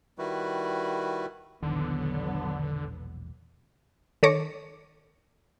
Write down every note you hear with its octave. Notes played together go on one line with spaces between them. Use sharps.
D#3 G3 E4 F#4 B4
E1 A#1 E2 D3 D#3 F#3 B3
D#3 A4 C#5 D6 A#6 C#7